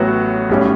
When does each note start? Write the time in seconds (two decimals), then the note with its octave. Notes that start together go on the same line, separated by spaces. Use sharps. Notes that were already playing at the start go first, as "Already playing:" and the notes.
Already playing: A1 A2 F#3 B3 F#4
0.49 B1 A2 G3 C#4 G4